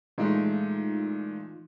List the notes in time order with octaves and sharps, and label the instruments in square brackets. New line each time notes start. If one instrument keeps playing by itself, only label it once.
[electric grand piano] A#2 G#3 A3 [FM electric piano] E3 D#4 F4